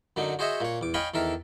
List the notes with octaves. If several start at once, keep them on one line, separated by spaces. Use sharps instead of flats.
F#2 D3 F#3 D#4
F#4 G#4 C5 C#5 D#5 E5
A#2 C#5
E2 D6
C#5 D#5 F5 G5 G#5 B5
E2 D#3 A4 A#4 E5